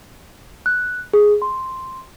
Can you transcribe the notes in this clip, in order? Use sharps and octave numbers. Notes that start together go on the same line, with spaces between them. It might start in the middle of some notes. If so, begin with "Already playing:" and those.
F#6
G#4
C6